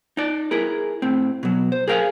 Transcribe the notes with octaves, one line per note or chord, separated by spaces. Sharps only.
D#4 D5
E4 G#4 A#4
A2 C4
B2 F#3
C5
G#4 A#4 F5 G5 G#5